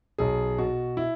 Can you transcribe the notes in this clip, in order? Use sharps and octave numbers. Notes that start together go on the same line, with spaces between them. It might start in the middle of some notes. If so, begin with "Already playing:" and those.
B1 G#4
B2 F#4
E4